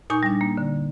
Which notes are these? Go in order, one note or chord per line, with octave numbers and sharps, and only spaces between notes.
A#2 D#4 G#5 C#6 G6
G3 D4
A#3
D3